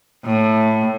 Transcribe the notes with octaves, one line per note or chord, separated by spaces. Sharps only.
A2